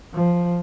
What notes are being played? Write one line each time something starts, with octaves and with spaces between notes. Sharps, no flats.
F3